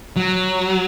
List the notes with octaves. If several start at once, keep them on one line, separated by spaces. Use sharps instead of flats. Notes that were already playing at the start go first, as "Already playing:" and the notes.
F#3